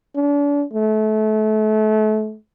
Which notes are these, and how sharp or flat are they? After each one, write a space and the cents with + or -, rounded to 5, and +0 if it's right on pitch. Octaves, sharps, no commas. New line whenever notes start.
D4 -40
A3 -30